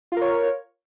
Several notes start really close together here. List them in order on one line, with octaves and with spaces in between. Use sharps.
F4 A#4 C#5